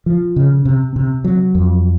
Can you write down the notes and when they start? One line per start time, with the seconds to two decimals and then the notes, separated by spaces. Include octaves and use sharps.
0.06 F3
0.36 C#3
0.65 C3
0.96 C3
1.24 F#3
1.55 F2